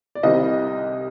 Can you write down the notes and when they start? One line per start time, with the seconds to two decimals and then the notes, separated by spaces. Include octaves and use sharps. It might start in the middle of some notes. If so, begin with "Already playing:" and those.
0.15 D5
0.23 C2 C3 D#3 G3 C4 D#5